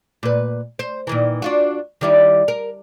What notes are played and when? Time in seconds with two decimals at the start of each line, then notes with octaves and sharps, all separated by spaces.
0.23 A#2 B4
0.79 C5
1.07 A#2 D#3 E3
1.42 D4 F4 F#4
2.01 D#3 G3 E4
2.48 A#4